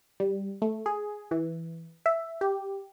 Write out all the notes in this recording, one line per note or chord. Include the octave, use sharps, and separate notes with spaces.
G3
A3
G#4
E3
E5
G4